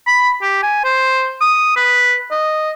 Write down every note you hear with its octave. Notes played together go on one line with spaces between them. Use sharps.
B5
G4
G#5
C5
D#6
B4
D#5